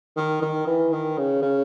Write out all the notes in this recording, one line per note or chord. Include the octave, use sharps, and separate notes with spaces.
D#3
D#3
E3
D#3
C#3
C#3